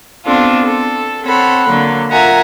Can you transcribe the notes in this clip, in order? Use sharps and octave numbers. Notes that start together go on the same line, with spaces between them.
B3 C4 D4 F4 A4
A4
C4 A4 C#5 F#5 B5 C6
D3 F#3 A#3
F4 A#4 E5 F#5 G#5 A#5